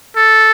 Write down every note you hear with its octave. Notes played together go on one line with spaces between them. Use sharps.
A4